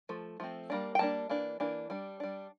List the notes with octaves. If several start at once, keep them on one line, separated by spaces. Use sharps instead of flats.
F3 A3
F3 A3 C4
G3 A#3 D4
G5
G3 A#3 D4 A5
E3 A#3 D4
E3 A#3 D4
G3 D4
G3 D4